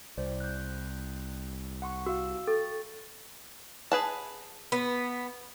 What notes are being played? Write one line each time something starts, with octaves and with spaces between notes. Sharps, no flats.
C2 C5 D5
F#6 G6
F#5 C6 C#6
F#4 F5 E6
A4 G5 C#6 A6
G#4 B4 A5
B3